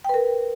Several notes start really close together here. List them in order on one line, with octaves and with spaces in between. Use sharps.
G5 B4 A#4